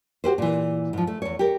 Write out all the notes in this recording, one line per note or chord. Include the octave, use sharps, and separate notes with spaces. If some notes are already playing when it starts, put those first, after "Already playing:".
F#4 G4 B4 C5
A#2 E3
G#2 F3
A3
E2 C#5
G4 A#4